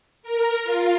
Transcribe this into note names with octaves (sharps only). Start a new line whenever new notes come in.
A#4
F4